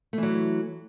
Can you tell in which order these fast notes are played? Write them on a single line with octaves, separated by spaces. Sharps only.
A3 E3 F#3